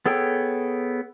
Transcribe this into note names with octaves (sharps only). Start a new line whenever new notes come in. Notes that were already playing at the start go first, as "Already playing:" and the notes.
B3 G#4 A4 C#5 G5